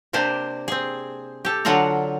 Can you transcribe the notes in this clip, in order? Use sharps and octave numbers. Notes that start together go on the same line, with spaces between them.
C3 A#3 D4 G4 C5
C4 G#4
G4 A4
D3 F#3 D4 F4 F#5 A#5